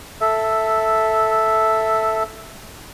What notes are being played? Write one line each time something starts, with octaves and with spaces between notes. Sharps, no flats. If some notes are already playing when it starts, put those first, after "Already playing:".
A4 E5